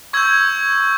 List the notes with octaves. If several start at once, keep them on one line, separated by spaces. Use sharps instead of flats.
C#6 E6 G6 G#6